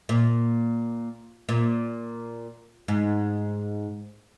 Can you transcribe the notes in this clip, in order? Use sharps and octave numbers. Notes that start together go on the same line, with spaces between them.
A#2
A#2
G#2